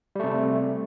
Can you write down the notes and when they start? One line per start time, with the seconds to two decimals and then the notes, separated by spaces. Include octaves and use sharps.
0.16 G3
0.20 A3
0.24 C3